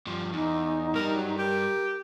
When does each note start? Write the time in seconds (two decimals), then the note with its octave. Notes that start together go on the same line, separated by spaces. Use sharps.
0.07 G2 F3
0.33 E2 D#4
0.95 G2 G3 A#4
1.15 F#3
1.38 G4 A#4